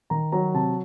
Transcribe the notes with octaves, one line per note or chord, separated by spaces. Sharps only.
D#3 A#5
F#3 A#5
C3 A5